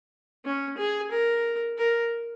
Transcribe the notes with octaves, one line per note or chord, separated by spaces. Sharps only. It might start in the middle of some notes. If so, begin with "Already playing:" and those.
C#4
G#4
A#4
A#4